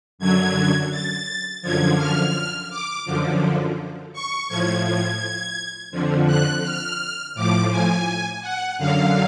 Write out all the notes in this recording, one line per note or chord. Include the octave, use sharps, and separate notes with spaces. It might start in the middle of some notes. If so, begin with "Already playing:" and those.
F#2 D3 F#3 G#6
A6
F#2 D3 F3 G#6
F6
D6
F#2 D3 F3
C#6
A2 F3 G#6
G#6
F2 D3 F3
F#6
F6
A2 F3 D6
G#5
F#5
F#2 D3 F#3 F5